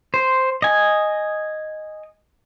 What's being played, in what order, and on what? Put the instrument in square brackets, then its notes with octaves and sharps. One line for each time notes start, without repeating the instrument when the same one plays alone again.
[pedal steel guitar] C5
D#5 G#5